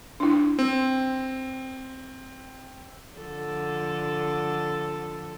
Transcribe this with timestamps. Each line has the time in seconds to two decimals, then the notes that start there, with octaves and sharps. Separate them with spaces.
0.20 D4 E4
0.59 C4
3.16 D3 F3 A4